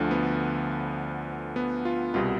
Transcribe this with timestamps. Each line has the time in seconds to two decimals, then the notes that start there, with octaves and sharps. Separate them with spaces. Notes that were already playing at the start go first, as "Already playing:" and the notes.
Already playing: D2 D3 F3
0.11 B3
1.56 B3
1.85 F4
2.14 C2 B2 G3 F4